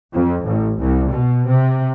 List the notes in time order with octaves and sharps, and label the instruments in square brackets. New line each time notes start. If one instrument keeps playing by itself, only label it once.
[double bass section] F2
A1
C2
B2
C3